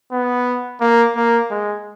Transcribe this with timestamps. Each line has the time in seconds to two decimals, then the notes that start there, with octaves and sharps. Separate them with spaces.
0.12 B3
0.81 A#3
1.16 A#3
1.51 G#3